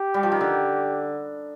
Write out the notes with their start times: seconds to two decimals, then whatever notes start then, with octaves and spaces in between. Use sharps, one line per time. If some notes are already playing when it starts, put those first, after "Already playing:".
Already playing: G4
0.14 G3
0.23 F3
0.32 D#3
0.41 D3